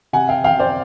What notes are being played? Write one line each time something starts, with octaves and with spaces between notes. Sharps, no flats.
C3 F#5 G#5
F5 G5
C3 F5 G5
C5 D5